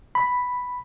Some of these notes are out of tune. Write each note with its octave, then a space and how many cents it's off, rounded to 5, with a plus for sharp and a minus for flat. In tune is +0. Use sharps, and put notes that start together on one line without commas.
B5 +0